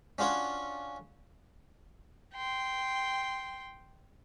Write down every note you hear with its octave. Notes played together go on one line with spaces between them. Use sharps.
C#4 D4 F4 F#4 C#5
G5 C6